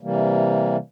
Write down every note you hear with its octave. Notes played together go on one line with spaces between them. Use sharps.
C3 E3 G3 A#3